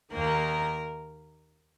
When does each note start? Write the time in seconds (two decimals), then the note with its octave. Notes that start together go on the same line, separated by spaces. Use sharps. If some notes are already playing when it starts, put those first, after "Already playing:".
0.11 D#2 D#3 A#3 A#4